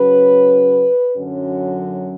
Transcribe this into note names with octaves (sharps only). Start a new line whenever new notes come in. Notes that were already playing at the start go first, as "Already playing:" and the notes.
Already playing: C#3 F#3 C#4 B4
F#2 D3 F#3 C#4